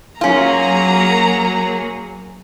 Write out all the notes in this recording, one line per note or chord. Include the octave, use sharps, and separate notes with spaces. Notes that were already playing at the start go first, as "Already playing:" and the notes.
F#3 A#3 C#4 F4 G#4 A#5